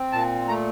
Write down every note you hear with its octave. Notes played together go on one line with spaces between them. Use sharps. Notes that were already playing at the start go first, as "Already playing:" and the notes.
Already playing: C4
A#2 A5
A3 A#5